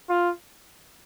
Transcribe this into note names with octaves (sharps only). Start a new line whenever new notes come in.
F4